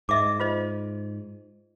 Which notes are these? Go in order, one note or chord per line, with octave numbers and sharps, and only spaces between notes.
G#2 D#5 E5 D6
F4 C5 D#5